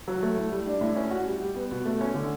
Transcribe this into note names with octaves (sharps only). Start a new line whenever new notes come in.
F#3
A3
A2
G3
D4
A2
C#4
F#4
G3
G3
B3
B2
A3
C#4
D3